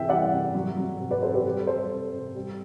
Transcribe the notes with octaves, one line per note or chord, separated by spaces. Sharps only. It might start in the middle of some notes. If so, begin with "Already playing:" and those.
Already playing: C3 E3 E5 G5
G3 D5 F#5
C3
F#3
F#3
C3
B4 D5
C3 A4 C5
G4 B4
G3
G3 A4 C5
C3
C3
G3